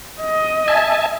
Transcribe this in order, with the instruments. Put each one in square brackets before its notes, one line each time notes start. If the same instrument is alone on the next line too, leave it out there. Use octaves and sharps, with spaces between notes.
[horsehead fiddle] D#5
[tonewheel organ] E5 G#5 A5